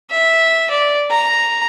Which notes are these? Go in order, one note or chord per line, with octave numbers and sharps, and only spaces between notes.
E5
D5
A#5